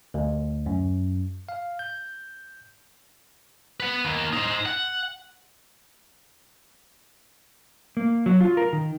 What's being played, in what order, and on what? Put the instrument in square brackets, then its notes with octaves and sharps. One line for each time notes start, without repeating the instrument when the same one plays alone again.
[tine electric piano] D2
F#2
F5
G6
[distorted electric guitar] B4 F#5
D#2 A#3
D#4 C5
F#5
[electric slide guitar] A#3
F#3
F4
A#4
D#3